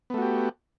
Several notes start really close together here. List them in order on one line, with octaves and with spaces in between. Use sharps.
B3 A3 F#4 G4